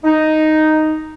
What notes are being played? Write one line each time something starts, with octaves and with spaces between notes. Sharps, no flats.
D#4